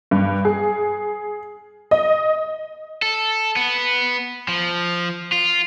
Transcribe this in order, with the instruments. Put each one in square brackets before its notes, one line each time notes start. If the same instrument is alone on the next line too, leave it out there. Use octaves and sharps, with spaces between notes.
[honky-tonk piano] G2
G#4
D#5
[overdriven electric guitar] A4
B3
F3
F4